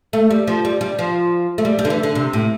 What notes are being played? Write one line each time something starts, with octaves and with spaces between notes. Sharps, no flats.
A3
G3
F3
G3
G3
F3
A3
G3
G3
D3
E3
D3
C3
A2